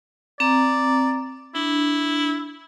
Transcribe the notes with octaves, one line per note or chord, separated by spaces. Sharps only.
C4 D5 A#5
D4 E4